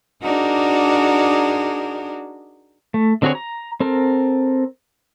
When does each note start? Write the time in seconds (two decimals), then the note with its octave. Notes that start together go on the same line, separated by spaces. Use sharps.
0.21 D4 D#4 F#4 G#4 A#4 D5
2.94 A3
3.22 D3 C4 F#4 G#4 C#5
3.35 A#5
3.80 C4 A4 A#4